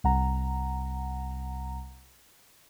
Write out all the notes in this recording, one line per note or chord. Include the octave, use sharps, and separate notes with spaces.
C2 F#5 A#5